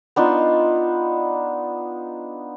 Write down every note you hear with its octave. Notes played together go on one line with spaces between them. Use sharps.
B3 D4 D#4 F4